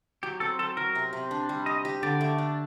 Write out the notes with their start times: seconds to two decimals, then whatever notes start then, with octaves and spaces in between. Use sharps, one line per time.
0.23 F#3 G4
0.40 C4 A4
0.59 F#3 A4
0.77 F#3 A#4
0.95 C3
1.13 C3
1.31 D4
1.49 G3
1.66 G4 D#5
1.85 G4
2.03 D3 D5
2.21 A3
2.38 D4